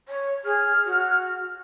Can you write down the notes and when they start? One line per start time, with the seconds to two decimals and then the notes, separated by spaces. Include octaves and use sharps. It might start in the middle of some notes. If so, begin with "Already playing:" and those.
0.08 C#5
0.44 G#4 F6
0.85 F#4